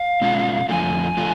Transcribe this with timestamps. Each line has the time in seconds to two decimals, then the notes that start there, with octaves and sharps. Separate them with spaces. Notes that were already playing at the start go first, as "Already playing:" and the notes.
Already playing: F5
0.21 B2 G#3 C#4 F4
0.69 F2 D3 F3 A3 F4 G#5
1.17 D3 F3 A3 F4